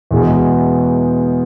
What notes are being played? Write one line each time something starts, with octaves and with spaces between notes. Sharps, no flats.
E2 B2 G#3